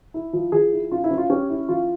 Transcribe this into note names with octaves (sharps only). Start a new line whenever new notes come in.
E4
F3
F3 G#4
E4
C#4 F4
E4
C#4
F4
C#4 G4
E4
F3 F4